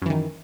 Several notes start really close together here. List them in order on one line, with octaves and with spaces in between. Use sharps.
F#2 E3 D#3